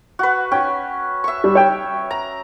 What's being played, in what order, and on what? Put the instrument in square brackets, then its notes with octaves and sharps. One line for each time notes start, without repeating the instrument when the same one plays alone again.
[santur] F#4 B4
[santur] C#4 [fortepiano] G5
[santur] E5 C#6
[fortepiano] G3
C#5 G5
[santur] A#5